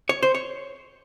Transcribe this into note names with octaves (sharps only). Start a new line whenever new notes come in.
C#5
C5
C#5